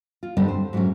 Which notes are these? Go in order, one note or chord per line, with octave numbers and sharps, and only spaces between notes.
F4
G2 D3 G3 C4 D4 D#4
C5
G#2 F#3 A3 C#4 F#4